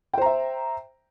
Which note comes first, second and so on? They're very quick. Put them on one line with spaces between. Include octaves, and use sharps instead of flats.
G5 C5 A#5 E5